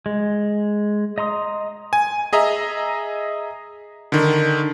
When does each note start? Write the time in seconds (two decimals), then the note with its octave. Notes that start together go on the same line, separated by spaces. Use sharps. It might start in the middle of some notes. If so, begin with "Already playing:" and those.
0.06 G#3
1.18 D#5 A#5 C6 D#6
1.93 G#5
2.33 G#4 D#5 E5 A#5
4.12 D3 D#3